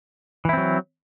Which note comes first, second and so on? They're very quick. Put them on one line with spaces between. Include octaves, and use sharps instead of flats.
E3 E4 C4 F#3